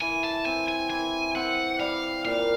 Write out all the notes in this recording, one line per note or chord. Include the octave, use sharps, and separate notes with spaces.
E3 G#5
A5
C4 G#5
G#5
E3 G#5
C4 F#5
G3 F5
A#2 F5